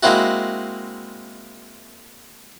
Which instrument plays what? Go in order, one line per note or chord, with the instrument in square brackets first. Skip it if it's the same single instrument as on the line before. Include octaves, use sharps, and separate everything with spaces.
[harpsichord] G#3 A#3 C4 E4 F#4